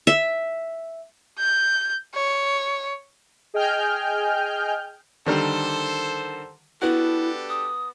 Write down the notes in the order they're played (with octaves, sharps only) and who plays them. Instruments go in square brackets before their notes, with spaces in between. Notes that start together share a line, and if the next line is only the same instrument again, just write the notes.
[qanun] E5
[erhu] G6
C#5
[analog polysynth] G#4 D#5 G5 G#5 F6 G6
[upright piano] D3 D#3 G3 [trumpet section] A4 C5
[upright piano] B3 F#4 [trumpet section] D4 G4 A4 [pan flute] E4
[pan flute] D#6